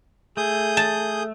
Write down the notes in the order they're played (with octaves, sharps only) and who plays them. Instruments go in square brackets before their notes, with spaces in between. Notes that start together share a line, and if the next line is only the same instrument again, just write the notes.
[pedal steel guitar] A3 [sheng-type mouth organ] G#4 D#6 G6
[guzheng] A5